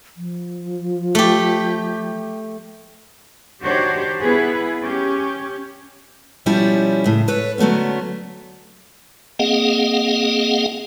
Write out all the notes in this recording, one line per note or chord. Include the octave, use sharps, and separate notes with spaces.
F3
A3 G4
D#3 D4 F#4 G4 C5 C#5
B3 E4 G#4 B4
C#4 G4
B2 F3 G3 C#4 E4
A2 C#3
A4 B4 C#5
D3 F#3 A3 B3 C#4
A#3 C4 G#4 D#5 F5 F#5